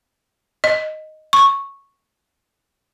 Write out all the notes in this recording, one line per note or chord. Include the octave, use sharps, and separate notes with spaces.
D#5
C#6